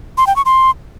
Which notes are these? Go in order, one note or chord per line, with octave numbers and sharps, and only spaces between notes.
C6
G5
C#6
C6